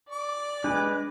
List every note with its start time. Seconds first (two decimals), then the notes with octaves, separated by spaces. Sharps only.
0.12 D5 D6
0.64 G#3 D4 B4